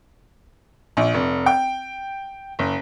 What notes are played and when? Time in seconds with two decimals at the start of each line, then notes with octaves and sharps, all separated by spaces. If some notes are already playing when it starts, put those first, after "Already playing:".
0.97 A#1
1.14 F1
1.46 G5
2.59 F#1